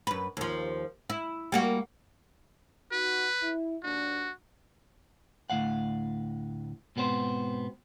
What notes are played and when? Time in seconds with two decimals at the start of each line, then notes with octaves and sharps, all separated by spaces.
0.07 F#2 B4
0.37 D#2 F3
1.10 E4
1.52 G3 A#3 F#4
2.92 D#4 F#4 B4
3.42 E4
3.83 D#2 D4 F#4
5.50 D2 A2 F3 F5 F#5
6.96 G#2 B2 B3 C4 C5